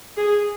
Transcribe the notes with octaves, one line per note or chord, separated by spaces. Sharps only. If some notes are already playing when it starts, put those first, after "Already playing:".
G#4